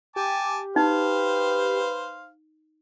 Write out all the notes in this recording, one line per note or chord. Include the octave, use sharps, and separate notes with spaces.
G4 G#5 A5 D6
D#4 B4 C5 F5